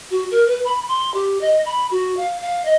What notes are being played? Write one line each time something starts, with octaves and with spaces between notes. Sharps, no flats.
F#4
A#4
B4
B5
C6
G4
D#5
B5
F#4
F5
F5
D#5